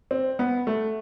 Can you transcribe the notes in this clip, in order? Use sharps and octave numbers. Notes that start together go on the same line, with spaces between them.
C4
B3
A3